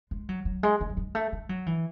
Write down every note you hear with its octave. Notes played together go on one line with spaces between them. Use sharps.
G#3
F#3
F#3
G#3
A3
F#3
G#3
A3
G#3
F#3
E3